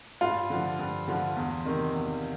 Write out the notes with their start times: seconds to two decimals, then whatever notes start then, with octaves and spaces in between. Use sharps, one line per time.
0.21 G2 F4
0.50 D3 F3
0.79 G2
1.08 D3 F3
1.36 E2
1.65 C3 D#3
1.94 E2